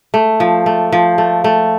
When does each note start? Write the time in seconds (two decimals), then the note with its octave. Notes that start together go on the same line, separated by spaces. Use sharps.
0.14 A3
0.40 F3
0.66 A3
0.92 F3
1.18 A3
1.44 A3